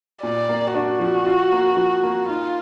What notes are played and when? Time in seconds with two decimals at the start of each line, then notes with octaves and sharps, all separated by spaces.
0.23 A#2 D5
0.49 A#3
0.74 D4 F#4
1.00 F3
1.26 F4
1.52 A#3
1.77 F3
2.03 A#3
2.29 D#4 F4